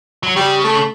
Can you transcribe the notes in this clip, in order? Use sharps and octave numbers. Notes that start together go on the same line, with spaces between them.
F#3
C#3 G3
A3